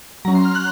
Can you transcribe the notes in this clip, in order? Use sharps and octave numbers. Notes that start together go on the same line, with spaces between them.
F#3 C#4 A#5
C6
F6
F#6